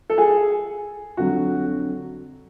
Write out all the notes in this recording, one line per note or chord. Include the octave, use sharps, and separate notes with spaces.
A4
G#4
F2 D3 F#3 F#4